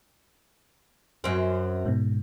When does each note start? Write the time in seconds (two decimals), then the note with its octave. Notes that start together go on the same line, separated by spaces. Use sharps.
1.24 F#2 C4
1.85 G#2 B2